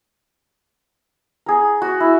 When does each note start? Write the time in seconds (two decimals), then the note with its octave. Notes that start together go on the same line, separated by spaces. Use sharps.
1.46 G#4 A#4
1.82 F#4
2.00 E4